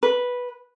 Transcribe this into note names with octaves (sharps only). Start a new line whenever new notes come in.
B4